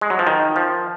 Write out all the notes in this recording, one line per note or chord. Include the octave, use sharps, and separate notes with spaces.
G#3
F#3
F3
D#3
F3